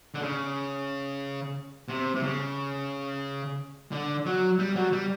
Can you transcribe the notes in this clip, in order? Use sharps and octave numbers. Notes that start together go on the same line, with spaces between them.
D3
C#3
C3
C3
C#3
D3
F#3
G3
F#3
G3